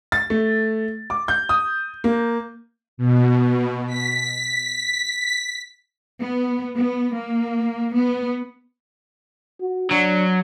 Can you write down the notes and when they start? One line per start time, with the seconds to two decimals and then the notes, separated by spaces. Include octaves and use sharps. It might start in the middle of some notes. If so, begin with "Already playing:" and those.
0.12 A6
0.30 A3
1.10 D6
1.28 G6
1.49 D#6
2.04 A#3
2.97 B2
3.87 B6
6.20 B3
6.77 B3
7.15 A#3
7.94 B3
9.61 F#4
9.91 F#3 D4